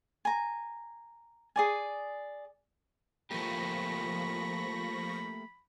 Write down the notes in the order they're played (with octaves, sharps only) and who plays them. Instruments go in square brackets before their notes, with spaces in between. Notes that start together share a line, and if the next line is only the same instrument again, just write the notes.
[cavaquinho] G#5 A#5
G#4 D5 G#5
[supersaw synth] F3 C#6 A#6 [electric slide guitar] A3 A#3 G4 [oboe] B5